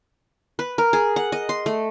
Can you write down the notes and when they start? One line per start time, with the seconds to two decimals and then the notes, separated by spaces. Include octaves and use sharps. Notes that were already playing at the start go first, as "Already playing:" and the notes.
0.59 B4
0.78 A#4
0.93 G#4
1.16 F#5
1.32 D#5
1.49 C6
1.66 A3